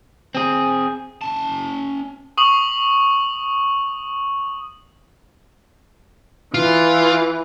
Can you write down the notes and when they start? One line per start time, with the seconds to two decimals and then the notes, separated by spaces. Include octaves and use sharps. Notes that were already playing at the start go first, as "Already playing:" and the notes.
0.35 C4 G#4
1.21 C#4 A5
2.37 C#6 D#6 F#7
6.54 E3 F4